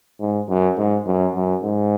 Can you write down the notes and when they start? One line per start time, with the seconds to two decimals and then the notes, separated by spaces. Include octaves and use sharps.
0.20 G#2
0.49 F#2
0.78 G#2
1.07 F#2
1.35 F#2
1.64 G#2